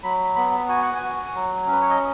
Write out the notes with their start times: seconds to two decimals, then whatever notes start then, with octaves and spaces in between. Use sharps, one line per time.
0.03 F#3 B5
0.36 B3 B5
0.68 F#4 G#5
0.82 F#5
0.94 G#5
1.02 F#4
1.35 F#3
1.67 C#4
1.72 B4
1.81 C#5
1.90 D#5